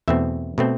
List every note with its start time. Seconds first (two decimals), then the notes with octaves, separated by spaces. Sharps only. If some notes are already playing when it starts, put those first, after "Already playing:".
0.08 E2 B2 A3 C4 E5
0.58 B2 A3 C4